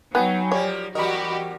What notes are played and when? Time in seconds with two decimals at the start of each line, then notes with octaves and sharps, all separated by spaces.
0.15 F#3 B3 D#4 G5 G#5 B5
0.51 F3 G3 A#3 C#5
0.95 E2 G3 F#4 G4 A#4 D#5 B5